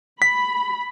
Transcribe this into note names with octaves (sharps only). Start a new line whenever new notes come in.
B5 B6